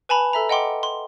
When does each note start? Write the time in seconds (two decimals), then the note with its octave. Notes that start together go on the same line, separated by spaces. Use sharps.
0.09 B4 G#5 A5 B5 F7
0.33 A4 E5 A#5
0.49 D#5 F#5 G5 C6 D6
0.83 C6